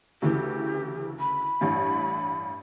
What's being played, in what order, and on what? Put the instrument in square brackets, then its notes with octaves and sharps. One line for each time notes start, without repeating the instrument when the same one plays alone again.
[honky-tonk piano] D2 C#3 E3 [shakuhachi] G4
[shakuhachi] B5
[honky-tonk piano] A1 G2